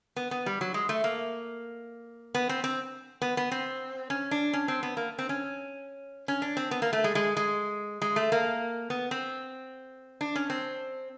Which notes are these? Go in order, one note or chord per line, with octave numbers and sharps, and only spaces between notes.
B3
B3
G3
F#3
G#3
A3
A#3
B3
C4
C4
B3
B3
C4
C#4
D4
C#4
C4
B3
A#3
C4
C#4
C#4
D4
C4
B3
A#3
A3
G#3
G#3
G#3
G#3
A3
A#3
B3
C4
D4
C#4
C4